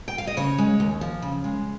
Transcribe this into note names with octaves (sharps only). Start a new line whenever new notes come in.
G5
F5
D#5
C#3 C#5
G#3
D#2
F3
C#3
G#3